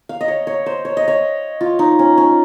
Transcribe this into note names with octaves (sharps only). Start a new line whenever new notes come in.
F5
D#5
C#5
C#5
C5
C#5
D#5
C#5
F4
D#4
C#4
C#4